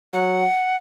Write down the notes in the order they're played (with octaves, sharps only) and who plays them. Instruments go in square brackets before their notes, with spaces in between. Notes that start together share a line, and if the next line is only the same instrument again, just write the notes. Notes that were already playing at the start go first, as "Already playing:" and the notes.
[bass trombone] F#3 [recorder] F#5